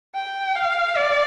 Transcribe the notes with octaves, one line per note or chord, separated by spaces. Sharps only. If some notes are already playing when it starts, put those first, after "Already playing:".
G5
F5
D5